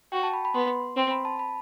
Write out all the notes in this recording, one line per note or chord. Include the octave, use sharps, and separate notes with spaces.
F#4 G5
A5
B5
B5
B3 C6
C4 C6
B5
A5
B5